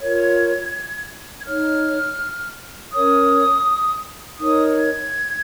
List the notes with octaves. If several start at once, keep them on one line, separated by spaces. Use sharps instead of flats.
F4 A#4 C#5 G#6
G#6
D#4 C#5 F6
C#4 A#4 C#5 D#6
D#4 A#4 C#5 D#6
G#6